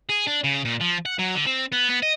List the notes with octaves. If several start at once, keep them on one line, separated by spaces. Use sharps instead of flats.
G#4
D4
C#3
A#2
F3
F#5
F#3
D3
C4
B3
B3
D#5